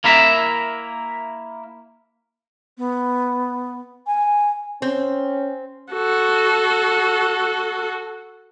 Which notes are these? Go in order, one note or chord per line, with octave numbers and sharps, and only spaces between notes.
A#3 E4 A#4 E5
B3
G#5
C4 C#4
F#4 A4